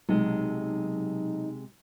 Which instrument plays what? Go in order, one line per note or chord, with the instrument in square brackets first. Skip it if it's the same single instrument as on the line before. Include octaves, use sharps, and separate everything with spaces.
[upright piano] B1 [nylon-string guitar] C3 G#3 [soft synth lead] D#4